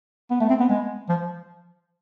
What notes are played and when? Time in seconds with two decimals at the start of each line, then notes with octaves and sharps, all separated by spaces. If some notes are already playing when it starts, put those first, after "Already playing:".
0.30 B3
0.40 A3
0.49 C4
0.60 B3
0.69 G#3
1.09 F3